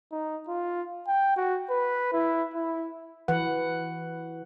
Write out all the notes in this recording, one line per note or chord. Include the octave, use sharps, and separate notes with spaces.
D#4
F4
G5
F#4
B4
E4
E4
E3 B4 F#5